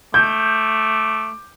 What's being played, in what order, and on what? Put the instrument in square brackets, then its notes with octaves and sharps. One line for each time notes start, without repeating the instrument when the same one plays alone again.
[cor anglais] A3 [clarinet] D6 [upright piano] G6